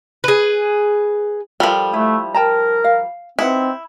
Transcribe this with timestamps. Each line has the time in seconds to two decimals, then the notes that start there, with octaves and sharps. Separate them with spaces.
0.24 G#4 B4
1.60 F3 G3 A4 A#4 G5
1.93 A3 E4
2.34 A#4 G5 A5 A#5
2.84 F5
3.39 C4 D#4 E4 B4 F#5